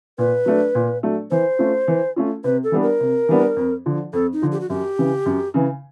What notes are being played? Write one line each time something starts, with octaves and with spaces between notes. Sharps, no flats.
A#2 B4
F#3 A3 D4
A#2
F#3 A3 D4
E3 C5
A3 C#4 F4
E3
A3 C#4 F4
C3 B4
A4
E3 G3 B3 D4
A#4
C3
E3 G3 B3 D4
F2
D3 F3
F2 A4
D#4
D3 F3
G4
F#4
F#2 G4
C#3 E3
F#2
C#3 E3